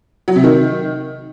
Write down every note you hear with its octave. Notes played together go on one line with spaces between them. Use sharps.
F#3
C3
D#3